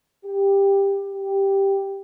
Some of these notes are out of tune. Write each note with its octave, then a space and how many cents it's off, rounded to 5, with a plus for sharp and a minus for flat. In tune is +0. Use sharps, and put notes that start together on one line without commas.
G4 +10
G4 +0